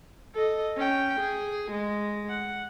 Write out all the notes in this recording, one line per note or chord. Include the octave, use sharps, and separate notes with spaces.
A4 D#5
C#4 G5
G#4
G#3
F#5